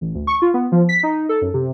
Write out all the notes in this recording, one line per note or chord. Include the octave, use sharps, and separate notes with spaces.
A1
D2
C#6
F4
B3
F3
B6
D#4
A4
F#2
C3